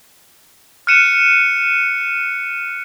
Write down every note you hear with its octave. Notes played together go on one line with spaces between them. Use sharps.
F6 F#6 C#7 D#7 E7